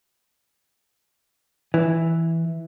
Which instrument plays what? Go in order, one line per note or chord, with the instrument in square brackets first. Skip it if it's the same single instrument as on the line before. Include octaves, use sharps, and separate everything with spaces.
[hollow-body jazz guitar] E3